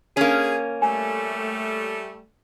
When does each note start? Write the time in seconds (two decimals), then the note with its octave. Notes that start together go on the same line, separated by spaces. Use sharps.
0.17 A#3 C#4 G#4
0.82 G3 A3 G#5